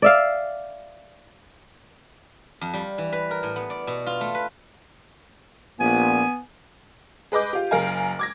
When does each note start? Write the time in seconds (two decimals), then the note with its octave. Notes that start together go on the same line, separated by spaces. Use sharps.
0.02 D5 E5 F5
2.61 F2
2.73 G3
2.98 E3
3.12 B4
3.31 A#4
3.43 A2
3.56 B3
3.70 D5
3.87 B2
4.06 F4
4.21 A3
4.35 B4
5.80 A#1 A#2 B3 G#5
7.32 G#4 B4 D#5 D6 G6
7.53 F4 G4
7.71 F#1 A#4 F5 G#5
8.19 D6 G#6 A#6